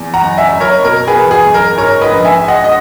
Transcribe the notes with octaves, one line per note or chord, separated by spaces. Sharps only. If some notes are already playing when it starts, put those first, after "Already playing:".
Already playing: E2
F#5 A#5
F#1
E5 G#5
F#1
A#4 C#5
B2 A#4
G#4 B4
E2
G#4
F#1
A#4
G#2 A#4 C#5
B4 D#5
A#1
E5 G#5
G#3
D#5 F#5
D#5